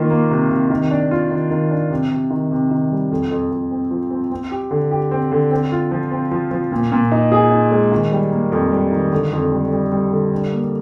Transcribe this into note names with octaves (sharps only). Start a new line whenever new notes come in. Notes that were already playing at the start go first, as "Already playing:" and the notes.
Already playing: D#3 A#3 F4
A#3
C3
C3
D#3
D4
F4
D#3
D#3
D4
C3
C3
D#3
C3
D#3
G3
F2
F2
F2
C4
F3
C4
C4
G4
D3
G4
C4
D3
C4
F4
F3
C4
F3
F3
A#2
A#2
D#4
G#4
D#4
G#3
D#3
G3
A#3
F2
G3
D#3
D3
F2
G3
G3
G3
D3
D4
A#3